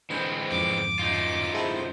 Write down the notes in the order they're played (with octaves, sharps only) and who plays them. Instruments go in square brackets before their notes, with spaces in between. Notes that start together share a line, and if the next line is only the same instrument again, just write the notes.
[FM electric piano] D3 C5 G#5 [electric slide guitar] E3 G#3 C4
[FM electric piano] F2 G#2 D3 [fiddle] D6
[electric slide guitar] F#2 D#4 F4
[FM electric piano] G#3 E4 A4 [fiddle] C5